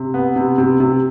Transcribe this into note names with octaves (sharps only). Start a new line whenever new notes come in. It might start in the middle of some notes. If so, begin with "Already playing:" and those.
Already playing: C3
B3
C3
C3
C3